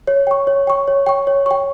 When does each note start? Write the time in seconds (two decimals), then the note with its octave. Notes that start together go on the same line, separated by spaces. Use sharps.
0.07 C#5
0.27 G5 C#6
0.47 C#5
0.67 G5 C#6
0.88 C#5
1.06 G5 C#6
1.27 C#5
1.46 G5 C#6